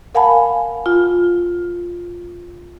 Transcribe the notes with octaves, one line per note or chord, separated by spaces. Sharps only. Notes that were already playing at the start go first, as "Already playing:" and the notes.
A#4 F5 F#5 G#5 A5 B5
F4